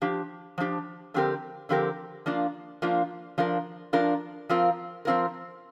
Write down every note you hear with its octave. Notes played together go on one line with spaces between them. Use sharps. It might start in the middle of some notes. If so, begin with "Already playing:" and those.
F3 D4 G4
F3 D4 G4
D3 F3 C4 G4 A#4
D3 F3 C4 G4 A#4
F3 A#3 D4 F4
F3 A#3 D4 F4
F3 D4 F4 A#4
F3 D4 F4 A#4
F3 C4 F4 A#4
F3 C4 F4 A#4